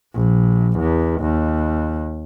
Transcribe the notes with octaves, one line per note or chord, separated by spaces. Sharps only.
A#1
E2
D#2